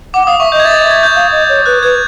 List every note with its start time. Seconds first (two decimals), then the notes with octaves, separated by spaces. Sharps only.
0.14 F#5 D6
0.27 F5 D#6
0.40 E5 C#6
0.52 D#5 G6
0.60 G#6
0.64 E5 A6
0.75 D#5 A6
0.84 E5
0.91 G#6
1.03 G6
1.15 F5
1.32 D#5
1.49 C#5
1.66 B4 F#6
1.83 B4 G#6